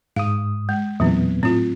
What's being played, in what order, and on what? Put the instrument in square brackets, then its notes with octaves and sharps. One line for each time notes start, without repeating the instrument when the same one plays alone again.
[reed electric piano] G#2 D#6 [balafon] F5
[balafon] G#3
[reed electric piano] E2 A#2 B3 [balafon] F#3 C4
[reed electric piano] A2 [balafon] C4 F4